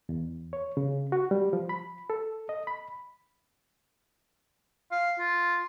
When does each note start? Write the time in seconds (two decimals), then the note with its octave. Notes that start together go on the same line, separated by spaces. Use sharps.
0.09 E2
0.53 C#5
0.77 C#3
1.12 F#4
1.31 G3
1.53 F3
1.69 B5
2.10 A4
2.49 D#5
2.67 B5
4.91 F5
5.19 F4